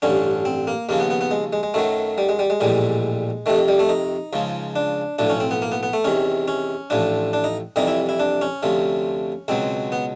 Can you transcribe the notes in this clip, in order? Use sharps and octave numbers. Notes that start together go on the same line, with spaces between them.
A1 G2 D3 C#4
C4
A#3
D#2 C#3 F3 A#3
B3
B3
B3
G#3
G#3
G#3
F#2 D#3 F#3 A3
G3
G#3
G3
G#3
A#1 A2 E3 G3
F2 C3 D#3 A3
G3
A3
D#4
C#2 C#3 F3
D4
B1 A2 F3 D4
C#4
C4
B3
A#3
B3
B3
A3
E2 C3 D#3 C#4
C#4
A1 A2 F3 D4
D4
D#4
F2 C3 E3 G3 D#4
E4
E4
D4
C#4
D2 C3 F3
C#2 B2 F#3 C4
B3